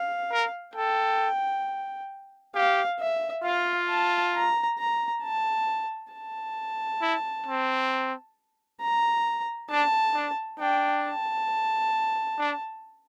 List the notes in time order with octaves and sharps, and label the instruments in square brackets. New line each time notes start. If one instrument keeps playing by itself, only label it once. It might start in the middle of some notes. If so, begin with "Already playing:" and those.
Already playing: [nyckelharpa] F5
[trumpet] A#4
[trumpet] A4 [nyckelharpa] G5
[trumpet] G4 [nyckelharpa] F5
[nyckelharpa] E5
[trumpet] F4 [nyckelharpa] F5
[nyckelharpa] A5
A#5
A#5
A5
A5
[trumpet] E4
C4
[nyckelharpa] A#5
[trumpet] D4 [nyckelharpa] A5
[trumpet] D4
[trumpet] D4 [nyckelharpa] G5
[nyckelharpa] A5
[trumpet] D4